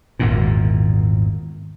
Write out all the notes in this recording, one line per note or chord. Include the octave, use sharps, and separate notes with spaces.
G#1 E2 A#2